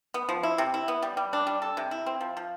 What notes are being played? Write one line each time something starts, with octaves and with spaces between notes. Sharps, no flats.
B3
F3
E4
C3
E4
B3
G3
G3
D4
G3
A4
C3
E4
C4
F3
F3